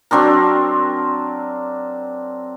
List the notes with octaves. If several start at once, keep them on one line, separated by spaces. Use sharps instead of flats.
F#3 C4 D4 A#4